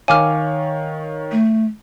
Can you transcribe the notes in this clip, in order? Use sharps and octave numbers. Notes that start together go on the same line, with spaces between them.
D#3 C#5 F5 G#5 D6 F6
A3